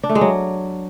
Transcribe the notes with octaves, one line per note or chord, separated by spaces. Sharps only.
D4
A3
G#3
F#3